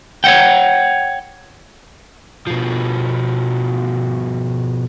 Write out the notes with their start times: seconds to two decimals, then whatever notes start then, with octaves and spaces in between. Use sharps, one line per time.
0.24 C#5 D#5 F#5 G5
2.47 B2 F3